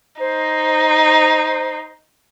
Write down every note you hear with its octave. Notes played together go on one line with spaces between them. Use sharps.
D#4 C5